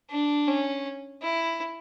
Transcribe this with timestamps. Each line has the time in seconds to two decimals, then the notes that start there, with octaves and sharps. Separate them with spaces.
0.10 D4
0.47 C#4
1.22 E4